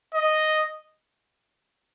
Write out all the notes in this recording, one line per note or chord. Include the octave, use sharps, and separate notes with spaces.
D#5